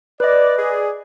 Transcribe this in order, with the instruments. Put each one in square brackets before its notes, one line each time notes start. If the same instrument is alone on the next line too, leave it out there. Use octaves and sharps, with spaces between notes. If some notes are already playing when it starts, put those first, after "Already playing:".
[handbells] B4 D#5 [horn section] D5
[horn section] G#4 D5